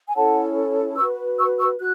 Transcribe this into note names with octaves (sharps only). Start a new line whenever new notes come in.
G#5
C#4 E4 A4 C#5 F#5 A5
F#4 B4 C#6 E6
C#6 E6
C#6 E6
F#4 F#6